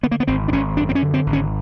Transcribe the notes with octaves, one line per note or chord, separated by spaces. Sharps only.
D3 B3
A#3
B3
G#1 C4
D4
G#1 C#4
F#2 D4
C4
C#4
D3
C4
G#1
C#4